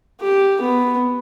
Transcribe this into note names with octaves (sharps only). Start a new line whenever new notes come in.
G4
B3